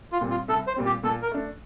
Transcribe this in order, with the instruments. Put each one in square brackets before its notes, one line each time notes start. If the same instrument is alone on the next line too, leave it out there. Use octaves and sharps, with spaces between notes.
[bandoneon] F4
[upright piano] A#2 G3 C4
[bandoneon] F4
[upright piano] C2 [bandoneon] A4
[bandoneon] C5
[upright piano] A#2 G3 C4
[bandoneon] G4
[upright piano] A#2 [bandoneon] A4
[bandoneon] A#4
[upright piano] A3 D4